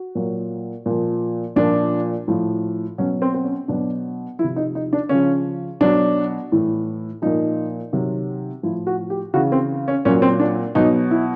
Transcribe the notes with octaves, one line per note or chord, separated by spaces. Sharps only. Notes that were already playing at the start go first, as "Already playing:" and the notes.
Already playing: F#4
A#2 F#3
A#2 F3
A#2 F3 D4
A2 F3
B2 F#3 C#4
C4
C4
C#4
B2 F#3 D4
F3 E4
C3
D#4
D#4
D4
C#3 F3 C#4
B2 F#3 D4
A2 E3
A#2 F3 D#4
C3 D#3 F#3
A2 F3 E4
F#4
G4
C#3 E3 F#4
C4
C#4
A#2 F#3 C#4
C4
D4
B2 F#3 D#4
E4